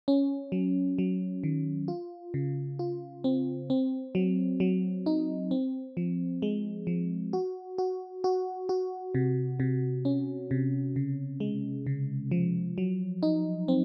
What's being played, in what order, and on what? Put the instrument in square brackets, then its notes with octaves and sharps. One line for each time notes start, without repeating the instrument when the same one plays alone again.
[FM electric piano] C#4
F#3
F#3
D#3
F4
C#3
F4
C4
C4
F#3
F#3
D#4
C4
F3
G#3
F3
F#4
F#4
F#4
F#4
C3
C3
C#4
C3
C#3
G#3
C#3
F3
F#3
D#4
C4